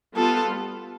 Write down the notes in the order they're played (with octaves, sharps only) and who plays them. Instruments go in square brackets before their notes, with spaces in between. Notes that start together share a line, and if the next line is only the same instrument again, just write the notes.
[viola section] G3 B3 F4 [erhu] A4